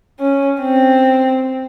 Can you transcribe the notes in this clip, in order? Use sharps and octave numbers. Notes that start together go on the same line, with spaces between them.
C#4
C4